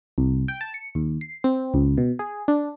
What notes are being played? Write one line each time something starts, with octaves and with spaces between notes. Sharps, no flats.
C2
G5
A5
C#7
D#2
C7
C4
C#2
B2
G#4
D4